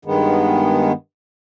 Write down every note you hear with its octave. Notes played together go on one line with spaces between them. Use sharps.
G2 D#3 G#3 B3